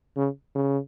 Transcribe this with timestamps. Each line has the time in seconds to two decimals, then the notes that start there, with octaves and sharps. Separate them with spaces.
0.16 C#3
0.55 C#3